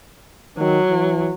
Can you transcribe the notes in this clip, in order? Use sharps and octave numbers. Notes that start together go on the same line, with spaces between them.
D#3 F#3
E3